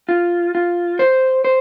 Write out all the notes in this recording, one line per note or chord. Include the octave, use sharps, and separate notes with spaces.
F4
F4
C5
C5